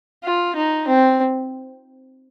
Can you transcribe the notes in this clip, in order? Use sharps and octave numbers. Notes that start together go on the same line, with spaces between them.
F4
D#4
C4